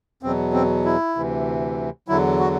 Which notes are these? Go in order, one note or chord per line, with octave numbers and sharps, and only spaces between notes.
E2 B2 F#3 C4
C4
E4
D2 C3 E3
E2 D3 F#3 E4
F#4